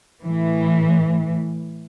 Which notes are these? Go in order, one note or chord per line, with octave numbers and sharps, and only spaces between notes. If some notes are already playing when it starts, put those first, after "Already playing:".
A2 E3